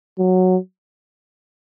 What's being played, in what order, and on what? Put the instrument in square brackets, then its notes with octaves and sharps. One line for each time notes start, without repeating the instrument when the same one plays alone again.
[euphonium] F#3